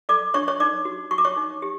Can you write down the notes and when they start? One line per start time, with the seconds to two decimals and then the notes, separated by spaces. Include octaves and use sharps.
0.09 A4 D5 D6
0.34 D4 C#5 C#6
0.48 C#5 C#6
0.60 D#4 D5 D6
0.85 F#4
1.11 F#4 C#6
1.18 D6
1.25 C#5 C#6
1.36 D#4
1.62 G4